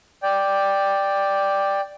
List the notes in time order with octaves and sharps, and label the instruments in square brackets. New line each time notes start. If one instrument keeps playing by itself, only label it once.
[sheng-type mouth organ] D5 G5